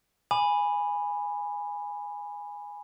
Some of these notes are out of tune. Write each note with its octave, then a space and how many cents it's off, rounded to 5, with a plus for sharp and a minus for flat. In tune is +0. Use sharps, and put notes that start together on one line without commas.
G#5 -10 B5 +0 D6 +35